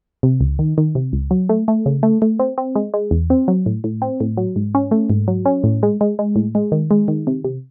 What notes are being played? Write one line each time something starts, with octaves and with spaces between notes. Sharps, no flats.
C3
C#2
D#3
D#3
C3
C#2
F#3
A3
A3
C#3
A3
A3
C4
C4
G#3
G#3
E2
C4
F#3
A2
A2
C4
A2
F#3
G#2
C#4
A3
G#2
F#3
C#4
A2
G#3
G#3
G#3
A2
G#3
D#3
G#3
D#3
C3
C3